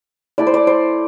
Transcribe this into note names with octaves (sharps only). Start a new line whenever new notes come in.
A3 E4 D5
C5
D5
C5